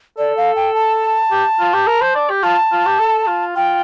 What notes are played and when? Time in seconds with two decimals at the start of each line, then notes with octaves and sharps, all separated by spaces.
0.18 A4 D5
0.37 F5
0.56 G5
0.75 A5
1.31 G4
1.60 F4
1.74 G4
1.87 A#4
2.02 C5
2.15 D5
2.30 G4
2.43 F4 A5
2.72 F4
2.86 G4
2.99 A4
3.27 F4
3.56 F4 G5